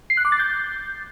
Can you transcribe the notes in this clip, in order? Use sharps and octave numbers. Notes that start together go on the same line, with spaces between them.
C7
F#6
D6
A6
G6